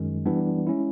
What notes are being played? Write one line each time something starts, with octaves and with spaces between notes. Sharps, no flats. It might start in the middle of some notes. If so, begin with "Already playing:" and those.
Already playing: F#2 D#3 G#3
E3 G3 B3 D4
G#3 C#4 E4